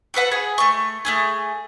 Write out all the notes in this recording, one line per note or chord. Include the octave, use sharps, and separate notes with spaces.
F#4 A4 B4 F#5
G#4
A3 C#6
A3 B3 G#4